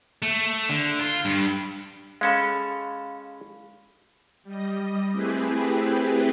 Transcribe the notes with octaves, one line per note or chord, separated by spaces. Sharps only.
A3
D3
F4
G2
G#3 C#4 A4 F5 B5
G3 D#5
A3 C4 E4 G4 G#4 B4